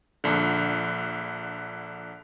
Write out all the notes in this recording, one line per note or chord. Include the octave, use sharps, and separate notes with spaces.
A#1 D3